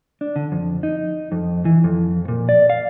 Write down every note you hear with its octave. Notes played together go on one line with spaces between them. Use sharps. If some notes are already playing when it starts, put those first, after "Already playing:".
D4
D3
F2
D#4
F2
E3
F2
A#2
D5
F5